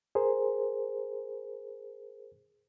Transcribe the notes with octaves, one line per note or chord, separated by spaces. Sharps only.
G#4 A#4 C5